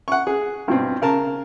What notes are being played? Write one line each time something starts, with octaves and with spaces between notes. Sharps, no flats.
F#5 C#6
G#4
G2 B2 C4
C#3 A#4 A5